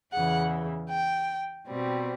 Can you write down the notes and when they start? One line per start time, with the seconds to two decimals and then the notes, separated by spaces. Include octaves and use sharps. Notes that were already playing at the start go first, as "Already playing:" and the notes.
0.13 E2 C#3 E3 F#5
0.90 G5
1.68 B2 G3 C4